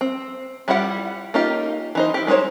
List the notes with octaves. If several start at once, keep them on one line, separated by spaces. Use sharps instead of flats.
C4
G3 E4 F4 G4 F#5
A#3 C#4 D#4 F4 G4
E3 D#4 C5
E4 G4
G#3 D#4 A4 C5 C#5